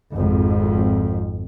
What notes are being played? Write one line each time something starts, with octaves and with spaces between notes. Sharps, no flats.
G#1 F2